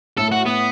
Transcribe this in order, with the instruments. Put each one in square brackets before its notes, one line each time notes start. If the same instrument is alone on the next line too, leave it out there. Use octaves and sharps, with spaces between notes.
[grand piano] A2 [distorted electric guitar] A4
[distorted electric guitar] F#4
B3